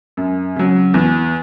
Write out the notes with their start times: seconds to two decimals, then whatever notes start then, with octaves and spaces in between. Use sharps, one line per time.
0.17 F#2
0.56 C#3 F#3
0.94 E2